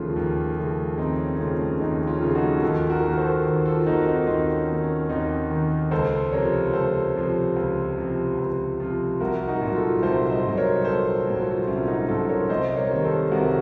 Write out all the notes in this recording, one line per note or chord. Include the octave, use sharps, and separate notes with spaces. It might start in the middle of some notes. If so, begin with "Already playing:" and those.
Already playing: D#2 C#3 F3 A3 C#4 F4
D#2
C#3 F3 A3
D#2 C4 D#4
C#4
C#4
C#3 F3 A3 C4
C#4
D#2 C4 D#4
C#4 F4
C#3 F3 A3
D#4 F#4
D#2 F4 A4
F#4 A#4
D#3 A#3
A4 C5
D#2
F4 A4
D#3 A#3 D#4 F#4
C4 D#4
D#2 C4 D#4
C#4
D#3 A#3
C#4
D#2 C4 D#4
D#3 A#3
C#2 A4 C5
C3 F3 A#4 C#5
C#2 A4 C5
C3 F3
C#2
C3 F3
C#2
C3 F3
C2 F#4 A#4
D#4 F#4
A#2 F#3
F4 A4
C2 A4 C5
C5 D#5
A#2 F#3
A#4 C#5
C2 A4 C5
A#2 F#3
F4 A4
C2 C#4 F4
D#4 F#4
A#2 F#3 F4 A4
A#4 C#5
C2 C5 D#5
A#4 C#5
C3 D#3 A#3
A4 C5
C2 F#4 A#4